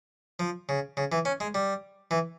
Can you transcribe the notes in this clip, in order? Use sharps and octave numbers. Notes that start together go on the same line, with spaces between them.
F3
C#3
C#3
E3
C#4
G#3
G3
E3